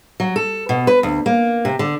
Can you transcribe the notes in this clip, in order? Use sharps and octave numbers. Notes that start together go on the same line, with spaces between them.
F#3
A4
B2
B4
D2
A#3
C3
D3